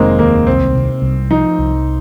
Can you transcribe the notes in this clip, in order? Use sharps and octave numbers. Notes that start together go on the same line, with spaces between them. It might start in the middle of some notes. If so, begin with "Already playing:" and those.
Already playing: F1 D#3 G#3 A#3 C4 D#4
D#2 A#3
C2 C4
C3
C2
F3 D#4
C2